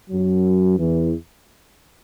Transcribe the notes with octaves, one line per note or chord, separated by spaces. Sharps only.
F#2 F#3
E2 E3